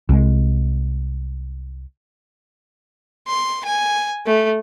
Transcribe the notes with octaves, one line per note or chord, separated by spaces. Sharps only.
C2 G#3
C6
G#5
A3